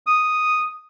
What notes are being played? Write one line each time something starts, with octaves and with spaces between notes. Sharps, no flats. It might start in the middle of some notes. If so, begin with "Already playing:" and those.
D#6